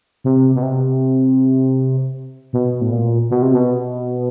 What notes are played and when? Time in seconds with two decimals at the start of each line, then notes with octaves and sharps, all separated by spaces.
0.24 C3
0.55 B2
0.63 C3
2.53 B2
2.81 A2
2.92 A#2
3.30 B2
3.42 C3
3.54 B2